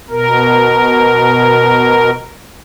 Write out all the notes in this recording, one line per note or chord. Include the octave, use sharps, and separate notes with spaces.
B2 A#4